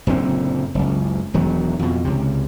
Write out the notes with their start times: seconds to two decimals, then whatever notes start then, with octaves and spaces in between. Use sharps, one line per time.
0.07 F#1 A#2 D3 C4
0.75 F#1 C#2
1.34 E1 D#3 F#3
1.79 F2 B2
2.05 C#2 C3